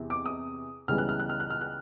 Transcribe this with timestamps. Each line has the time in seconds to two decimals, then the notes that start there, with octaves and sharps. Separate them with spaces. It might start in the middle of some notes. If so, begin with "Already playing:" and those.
Already playing: E2 C3 E3
0.10 D6
0.26 D#6
0.88 C#2 C#3 E3 G3 B3 F6
0.98 F#6
1.09 F6
1.20 F#6
1.29 F6
1.40 F#6
1.50 F6
1.61 F#6